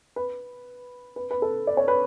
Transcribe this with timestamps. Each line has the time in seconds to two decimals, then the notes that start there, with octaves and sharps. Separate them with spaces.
0.16 B4
1.16 B4
1.31 B4
1.42 A4
1.67 D5
1.77 C#5
1.88 B4